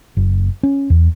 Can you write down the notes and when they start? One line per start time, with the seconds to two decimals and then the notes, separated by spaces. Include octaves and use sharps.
0.17 F#1
0.63 C#4
0.90 E2